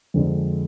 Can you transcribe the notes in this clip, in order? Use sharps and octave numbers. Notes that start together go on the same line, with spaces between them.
F2 D3 G#3